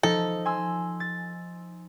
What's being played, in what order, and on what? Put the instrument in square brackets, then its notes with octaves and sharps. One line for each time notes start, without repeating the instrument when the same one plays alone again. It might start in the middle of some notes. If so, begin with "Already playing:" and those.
[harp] F3 D#4 [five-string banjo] A4
[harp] G#5 C6 E6
A6